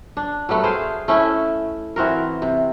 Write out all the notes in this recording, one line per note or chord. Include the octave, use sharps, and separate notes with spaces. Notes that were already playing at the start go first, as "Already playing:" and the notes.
D4
F#3 G3 A3 B3
G#4 C5 F5
A3 C#4 E4
E3 C4 F#4 A#4
C3